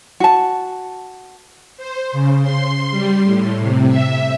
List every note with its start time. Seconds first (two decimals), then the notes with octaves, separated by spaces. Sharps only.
0.20 F#4 A5
1.77 C5
2.12 C#3
2.42 C6
2.91 G3
3.24 A2
3.59 C3
3.89 E5